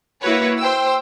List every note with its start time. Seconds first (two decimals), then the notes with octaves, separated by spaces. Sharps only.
0.22 A#3 E4 F#4 B4 C#5
0.59 C5 G5 E6